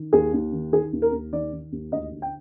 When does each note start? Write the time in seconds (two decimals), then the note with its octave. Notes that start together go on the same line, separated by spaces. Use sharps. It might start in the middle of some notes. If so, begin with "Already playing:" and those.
Already playing: D#3
0.13 D#2 G#4
0.33 D#2
0.52 D#3
0.72 D#3 G#4
0.93 D#2
1.02 A#4
1.12 D#2
1.32 D#3 D5
1.53 D#3
1.72 D#2
1.92 D2 D#5
2.11 D3
2.22 G5